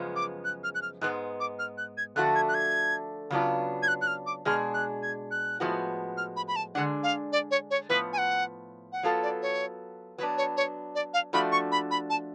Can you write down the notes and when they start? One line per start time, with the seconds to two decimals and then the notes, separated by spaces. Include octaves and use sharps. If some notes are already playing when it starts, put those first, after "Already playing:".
Already playing: F#2 C#3 F3 G#3 B3
0.16 D6
0.45 F#6
0.64 F6
0.75 F#6
0.82 F6
1.01 G#2 G#3 B3 F#6
1.40 D6
1.59 F6
1.78 F#6
1.98 G#6
2.16 D3 F3 A3 D4 F#4 F#6
2.35 G#6
2.49 F#6
2.54 G#6
3.30 C#3 F#3 B3 D4 F4
3.83 G#6
3.88 F#6
4.01 F#6
4.07 F6
4.26 D6
4.45 B2 G#3 D4 G#4 F6
4.74 F#6
5.03 G#6
5.31 F#6
5.60 A2 F3 G#3 B3 F#4
6.17 F6
6.36 B5
6.48 B5
6.56 A5
6.75 D3 G#3 D4 F#5
7.03 F5
7.32 D5
7.51 C#5
7.71 C#5
7.89 A2 F3 B3 B4
8.13 G#5
8.18 F#5
8.92 F#5
9.03 F#3 B3 F4 A4 F5
9.23 D5
9.42 C#5
10.18 F#3 B3 D4 B4
10.37 C#5
10.57 C#5
10.95 D5
11.14 F5
11.33 F3 A3 D4 F#4 B5
11.52 C#6
11.72 B5
11.91 B5
12.10 A5